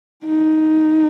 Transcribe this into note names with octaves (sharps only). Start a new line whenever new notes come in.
D#4